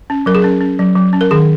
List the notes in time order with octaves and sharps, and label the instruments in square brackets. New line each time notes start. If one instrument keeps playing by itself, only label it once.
[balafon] C#4
F#3 A#4
G#4
C#4 A#4
C#4
F#3
F#3
C#4
A#4
D#3 G#4